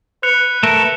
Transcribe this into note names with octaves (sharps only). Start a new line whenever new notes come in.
B4 F#6 C#7 F7
A3 A4 A#4